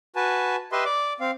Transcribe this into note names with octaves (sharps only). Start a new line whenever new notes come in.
F#4 B4 G#5 A5
G4 B4 D#5 E5 C6
D5 D6
C4 F5